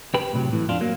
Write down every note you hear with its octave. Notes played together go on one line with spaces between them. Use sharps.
G4 B4
A2 C3 F#3
A2 E3
F2 D4 F4
F#3 A#3